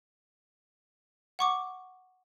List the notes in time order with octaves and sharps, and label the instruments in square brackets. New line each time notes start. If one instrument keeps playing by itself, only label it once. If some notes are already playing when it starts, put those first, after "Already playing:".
[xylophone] F#5 C#6 D6